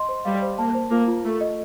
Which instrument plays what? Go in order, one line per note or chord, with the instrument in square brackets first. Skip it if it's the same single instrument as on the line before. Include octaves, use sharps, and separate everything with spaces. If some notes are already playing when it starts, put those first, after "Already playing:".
Already playing: [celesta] D#5 C6
C5
[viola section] G3 [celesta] F5
[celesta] C5
[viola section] A#3 [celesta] A5
[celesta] C5
[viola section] A#3 [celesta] F4
[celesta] F4
[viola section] A3 [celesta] F4
[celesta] D#5